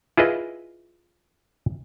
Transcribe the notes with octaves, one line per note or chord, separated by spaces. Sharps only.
E4 F4 G#4 B4 D#5